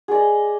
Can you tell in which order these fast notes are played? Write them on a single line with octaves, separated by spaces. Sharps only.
G#4 D5 D#5